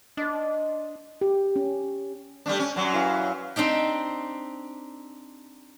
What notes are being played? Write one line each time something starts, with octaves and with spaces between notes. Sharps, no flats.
D4 C5 D#5
G4
C#4
G3 A3 D4
C#4
F#2 F#3
E3 F5
C4 D4 D#4 G4